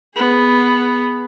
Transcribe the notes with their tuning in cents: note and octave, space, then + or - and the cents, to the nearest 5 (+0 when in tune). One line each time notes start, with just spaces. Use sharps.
B3 +0 G#4 +0